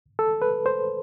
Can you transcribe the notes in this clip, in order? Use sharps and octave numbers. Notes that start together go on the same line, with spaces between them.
A4
B4
C5